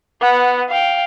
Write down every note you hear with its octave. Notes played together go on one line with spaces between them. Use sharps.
B3 F#5
F5 G5